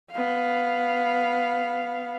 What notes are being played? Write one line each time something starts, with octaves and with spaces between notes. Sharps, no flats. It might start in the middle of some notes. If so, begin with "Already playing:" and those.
B3 F5